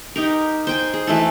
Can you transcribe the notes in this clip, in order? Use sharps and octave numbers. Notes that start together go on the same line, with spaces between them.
D#4 G4 A#4
C5 G5 G#5
G#4
E3 A3 F#4 A4